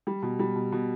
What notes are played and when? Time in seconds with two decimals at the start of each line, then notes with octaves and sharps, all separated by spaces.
0.07 G3
0.22 B2
0.39 G3
0.56 B2
0.72 B2